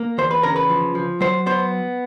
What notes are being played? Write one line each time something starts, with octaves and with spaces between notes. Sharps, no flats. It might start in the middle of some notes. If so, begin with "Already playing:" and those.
Already playing: A#3
E2 C5
B4
C#3 A#4
B4
F3
F3
F#3 C5
B3 C5